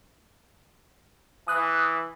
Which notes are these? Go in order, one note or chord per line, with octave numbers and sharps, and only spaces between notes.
E3 D#6 F#6